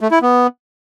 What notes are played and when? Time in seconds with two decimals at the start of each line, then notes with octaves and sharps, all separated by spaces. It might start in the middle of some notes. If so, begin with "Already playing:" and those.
0.01 A3
0.11 E4
0.22 B3